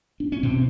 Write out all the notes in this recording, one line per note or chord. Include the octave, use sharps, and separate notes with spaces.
D4
C#4
B2 C4